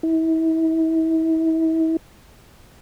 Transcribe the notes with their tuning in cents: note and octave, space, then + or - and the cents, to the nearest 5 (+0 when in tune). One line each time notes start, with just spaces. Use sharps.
E4 -35